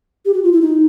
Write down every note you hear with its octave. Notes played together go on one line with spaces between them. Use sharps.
G4
F#4
F4
E4
D#4